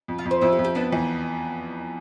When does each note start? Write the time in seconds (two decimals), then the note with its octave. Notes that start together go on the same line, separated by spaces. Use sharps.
0.08 F2
0.19 F4
0.25 F2
0.31 C5
0.41 F2 E4
0.53 G4
0.59 F2
0.64 G4
0.75 B3 D4
0.93 E2